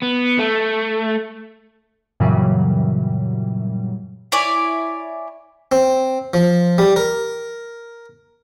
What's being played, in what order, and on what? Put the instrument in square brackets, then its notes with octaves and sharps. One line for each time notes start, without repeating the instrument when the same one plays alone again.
[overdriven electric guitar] B3
A3
[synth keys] F#2 A#2 C#3 E3 F#3 G3
[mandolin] E4 C#5 D5 G#5
[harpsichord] C4
F3
G3
A#4